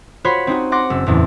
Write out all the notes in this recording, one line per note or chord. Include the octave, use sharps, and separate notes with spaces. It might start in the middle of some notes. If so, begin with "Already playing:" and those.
F4 F#4 C5 C#5 B5
C4 D#4 F#4
F#5 C6 D6 F#6 A#6
F#1 E6
F#1 E2 A2